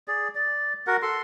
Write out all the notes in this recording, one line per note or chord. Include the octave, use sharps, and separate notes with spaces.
G#4 D5
D5
F#4 A#4 F#5
A4 C6